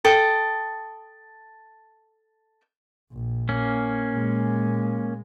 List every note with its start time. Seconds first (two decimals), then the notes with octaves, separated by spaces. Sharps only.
0.05 A4 G5 D#6
3.12 A#1
3.49 A#3 C#4
4.13 A#2 G#3